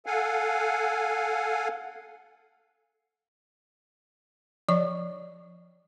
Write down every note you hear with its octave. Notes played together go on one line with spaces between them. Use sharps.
A4 F5 F#5 G#5
F3 C#5 D5 C#6